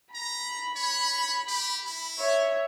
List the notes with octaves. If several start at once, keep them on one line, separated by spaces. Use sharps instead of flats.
A#5 B5
C#5
G4
E4
C#5 E5